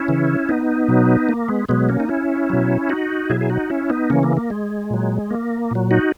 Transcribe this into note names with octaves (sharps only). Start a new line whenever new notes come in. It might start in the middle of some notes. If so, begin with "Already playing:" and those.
Already playing: C#4 E4
C#3 E3
B3 D#4
B2 F#3
A#3
G#3 B3
B2 F#3 G#3 B3
A#3 C#4
D#4
C#4 E4
B2 F#3
D#4 F#4
B2 F#3 E4 G#4
G#4
D#4 F#4
C#4 E4
B3 D#4
C#3 E3 A#3 C#4
A#3
A#3
G#3
A#2 F#3
A#3
A#2 F#3
D#4 F#4